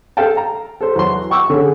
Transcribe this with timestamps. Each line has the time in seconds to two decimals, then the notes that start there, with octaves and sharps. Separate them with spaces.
0.17 A4 F5 G5 A5
0.37 A#5
0.81 A4 C5
0.96 E2 F#3 F#4 F#5 C6
1.30 G5 C#6 D6 E6
1.50 D3 C#4 G#4